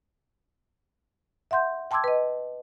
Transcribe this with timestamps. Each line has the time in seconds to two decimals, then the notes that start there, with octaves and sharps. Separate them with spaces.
1.51 E5 F#5 C6 G6
1.91 G5 A5 C6 D6 E6 G#6
2.04 B4 D#5